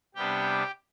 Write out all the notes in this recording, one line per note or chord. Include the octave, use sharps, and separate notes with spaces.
C3 G3 B3 D4 G4 G5